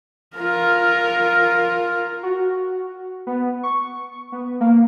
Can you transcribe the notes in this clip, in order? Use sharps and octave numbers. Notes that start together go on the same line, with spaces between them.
F4 A#4
F#4
B3
C#6
B3
A#3